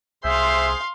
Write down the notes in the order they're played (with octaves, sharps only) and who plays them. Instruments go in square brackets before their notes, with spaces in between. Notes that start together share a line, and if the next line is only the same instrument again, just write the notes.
[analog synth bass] C2 [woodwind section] G#4 C5 [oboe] E5 [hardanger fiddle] F5 C6